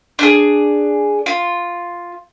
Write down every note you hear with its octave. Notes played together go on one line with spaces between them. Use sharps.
D4 G#4
F4